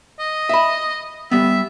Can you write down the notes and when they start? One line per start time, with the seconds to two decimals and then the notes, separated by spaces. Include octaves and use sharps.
0.20 D#5
0.49 E5 B5
1.31 G3 B3 E5